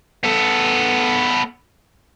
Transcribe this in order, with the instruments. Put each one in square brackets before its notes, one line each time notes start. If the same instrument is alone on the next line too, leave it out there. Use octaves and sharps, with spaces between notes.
[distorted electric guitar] B3 A4